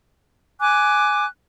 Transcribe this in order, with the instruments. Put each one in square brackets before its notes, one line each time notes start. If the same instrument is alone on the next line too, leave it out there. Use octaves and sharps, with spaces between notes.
[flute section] G#5 D6 F#6